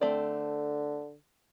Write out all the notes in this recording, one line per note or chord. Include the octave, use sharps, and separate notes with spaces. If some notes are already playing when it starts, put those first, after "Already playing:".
D3 A3 C4 D5